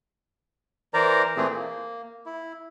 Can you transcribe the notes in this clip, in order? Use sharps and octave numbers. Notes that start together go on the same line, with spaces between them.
E3 A#4 C5 D5 A#5
A#2 E3 A3 C4 G#4
A#3
E4